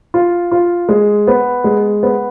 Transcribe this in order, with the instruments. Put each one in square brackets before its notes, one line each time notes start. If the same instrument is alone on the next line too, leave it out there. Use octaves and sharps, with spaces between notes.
[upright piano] F4
F4
G#3
B3
G#3
B3